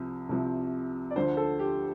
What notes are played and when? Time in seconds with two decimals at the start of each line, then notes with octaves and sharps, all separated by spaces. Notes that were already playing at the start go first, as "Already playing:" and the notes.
Already playing: C2 C3 F3
0.29 C2 C3 F3
1.10 D5
1.16 D2 D3 F3 C5
1.37 A4
1.59 G4